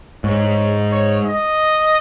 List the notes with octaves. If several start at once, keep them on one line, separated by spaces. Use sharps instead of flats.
G#2 C#5
C#5
D#5